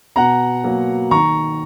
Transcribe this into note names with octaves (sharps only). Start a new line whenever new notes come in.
B2 F#5 A#5
F#3 A#3
D#3 A#5 C#6